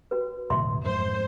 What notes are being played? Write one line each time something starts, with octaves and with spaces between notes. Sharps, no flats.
F#4 B4
E1 A2 D3 E5 C6
F2 G#2 A3 C5